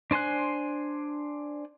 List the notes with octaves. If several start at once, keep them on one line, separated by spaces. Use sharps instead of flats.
D4 C5 G#5 C6 F#6